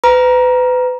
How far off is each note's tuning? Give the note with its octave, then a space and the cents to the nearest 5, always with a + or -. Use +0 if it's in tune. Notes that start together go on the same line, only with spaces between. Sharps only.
B4 +30 A#5 +20